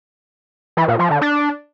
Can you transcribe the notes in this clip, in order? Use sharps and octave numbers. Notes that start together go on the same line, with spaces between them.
E3
A#2
F3
D3
D4